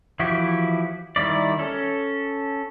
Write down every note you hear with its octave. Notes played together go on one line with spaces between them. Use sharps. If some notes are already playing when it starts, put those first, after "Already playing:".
E3 F3 E4 F#4 G4
D#3 G3 E4 D5
C#4 A4